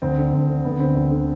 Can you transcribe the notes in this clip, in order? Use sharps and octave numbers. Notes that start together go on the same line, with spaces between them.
D2 C4
D3
D2
D3
D2 B3
D3 C4
D2
D3